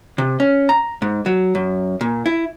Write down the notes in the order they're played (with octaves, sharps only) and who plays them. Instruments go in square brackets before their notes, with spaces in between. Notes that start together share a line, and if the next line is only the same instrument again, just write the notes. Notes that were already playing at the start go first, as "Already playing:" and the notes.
[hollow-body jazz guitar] C3
C#4
A#5
G#2
F#3
F#2
A#2
E4